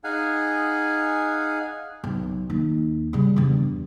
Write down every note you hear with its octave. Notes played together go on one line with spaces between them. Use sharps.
D#4 G#4 F5 F#5 G#5
B1
D#2 D#4
C#3 G3
E2 G2